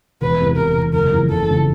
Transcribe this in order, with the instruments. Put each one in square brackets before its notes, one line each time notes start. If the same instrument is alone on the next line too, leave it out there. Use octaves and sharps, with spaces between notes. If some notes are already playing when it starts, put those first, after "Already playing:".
[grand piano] E1 [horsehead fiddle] B4
[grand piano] E2 C3
[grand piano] E1 [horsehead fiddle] A#4
[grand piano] E2 C3
[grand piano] F#1 [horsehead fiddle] A#4
[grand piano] F2 C#3 E3
[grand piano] F#1 [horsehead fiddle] A4
[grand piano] F2 C#3 E3